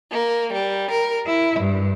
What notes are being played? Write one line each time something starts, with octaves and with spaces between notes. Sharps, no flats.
A#3
G3
A#4
E4
G2